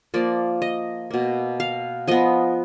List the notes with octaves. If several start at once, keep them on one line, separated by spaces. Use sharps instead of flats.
F3 A#3 D5
D#5
B2 A#3
F5
F3 B3 D#5